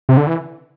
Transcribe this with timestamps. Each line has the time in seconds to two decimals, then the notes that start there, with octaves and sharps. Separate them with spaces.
0.09 C3
0.17 D3
0.27 E3